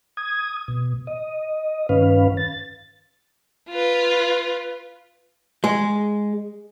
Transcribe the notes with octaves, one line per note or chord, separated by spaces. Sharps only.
D#6 G#6
B2
D#5
G2 D#3 C#4 B4 F5
A6
F4 B4
G#3